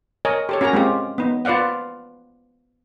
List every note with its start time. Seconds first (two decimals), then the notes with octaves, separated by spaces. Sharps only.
0.25 A#4 C#5 D#5 G#5
0.49 G4 A4 C#5
0.61 C#4 F#4 A#4 G#5 A#5
0.73 G#3 C4 F4 G4
1.18 B3 D#4
1.45 F4 B4 D5 F5 F#5